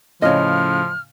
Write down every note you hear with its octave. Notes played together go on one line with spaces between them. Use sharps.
A2 C#3 F3 C#5 D#5 F6